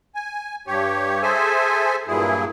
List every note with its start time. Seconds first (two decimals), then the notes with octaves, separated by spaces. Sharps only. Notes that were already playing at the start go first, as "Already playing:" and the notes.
0.15 G#5
0.67 G2 G4 C#5
1.22 G#4 A4 C5 E5 G#5
2.07 G2 A#2 F#3 E4 G#4